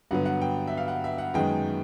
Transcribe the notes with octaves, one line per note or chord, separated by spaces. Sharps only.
G2 D3 F#3 B3 F#5
F#5
G5
E5
F5
F#5
E5
F#5
F#2 D#3 G#3 B3 G5